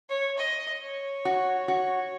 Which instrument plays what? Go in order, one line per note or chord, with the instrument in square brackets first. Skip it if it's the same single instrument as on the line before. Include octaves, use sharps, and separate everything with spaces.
[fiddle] C#5
D#5
C#5
[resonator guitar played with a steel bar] F#4
F#4